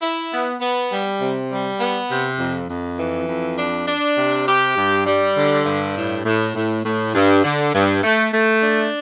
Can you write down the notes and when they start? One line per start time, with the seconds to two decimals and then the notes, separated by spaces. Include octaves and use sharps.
0.02 E4
0.32 B3
0.61 B3
0.91 G3
1.21 C3
1.50 G3
1.80 B3
2.10 C3
2.39 F2
2.69 F2
2.98 E3
3.29 F2
3.58 D4
3.88 D4
4.18 C3
4.47 G4
4.77 G2
5.07 G3
5.36 D3
5.66 G2
5.96 A2
6.25 A2
6.55 A2
6.85 A2
7.15 G2
7.44 D3
7.74 G2
8.04 A3
8.33 A3
8.63 D4